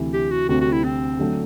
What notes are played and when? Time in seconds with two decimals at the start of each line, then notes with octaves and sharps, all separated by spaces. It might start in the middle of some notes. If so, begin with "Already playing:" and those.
Already playing: D2 C3 E3
0.14 G4
0.31 F#4
0.49 D2 C3 G3 C4 F#4
0.61 F#4
0.72 E4
0.84 C4
1.19 D3 F#3 A3